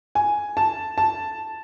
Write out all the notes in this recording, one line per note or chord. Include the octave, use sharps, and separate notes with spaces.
G#5
A5
A5